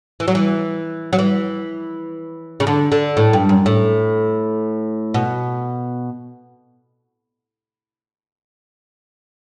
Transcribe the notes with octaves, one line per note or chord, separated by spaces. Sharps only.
E3
F#3
E3
F#3
E3
C#3
D3
D3
A2
G2
F#2
A2
B2